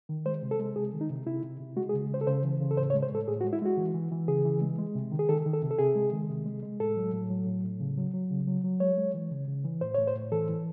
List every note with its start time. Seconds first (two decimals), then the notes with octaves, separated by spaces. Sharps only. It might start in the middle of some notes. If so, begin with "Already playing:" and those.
0.09 D#3
0.26 G#3 C5
0.42 C3
0.51 A4
0.59 G#3
0.76 C3 G#4
0.93 D#3
1.01 D#4
1.10 C3
1.26 C3 E4
1.43 C3
1.60 C3
1.77 G#3 F#4
1.89 G#4
1.93 C#3
2.10 C#3 C5
2.21 A4
2.27 C#3 C5
2.44 E3
2.60 C#3
2.71 A4
2.77 A2 C5
2.90 C#5
2.94 G#3
3.03 C5
3.11 A2 A4
3.28 A2 G#4
3.41 F#4
3.44 G#3
3.53 E4
3.62 G#3 F#4
3.77 E3
3.94 E3
4.12 E3
4.28 C#3 G#4
4.45 E3
4.62 G#3
4.78 G#3
4.95 C3
5.12 D#3
5.19 G#4
5.29 D#3 A4
5.46 D#3
5.53 A4
5.62 C3
5.71 A4
5.78 C3 G#4
5.96 G#3
6.12 D#3
6.29 C3
6.46 G#3
6.63 G#3
6.80 A2 A4
6.97 F#3
7.13 A2
7.30 F#3
7.47 A2
7.64 A2
7.80 C#3
7.97 F#3
8.14 F#3
8.30 C#3
8.47 F#3
8.64 F#3
8.80 G#3 C#5
8.98 G#3
9.14 E3
9.31 C#3
9.48 C#3
9.64 E3
9.81 A2 C5
9.95 A2 C#5
10.07 C5
10.15 A2
10.32 E3 A4
10.49 E3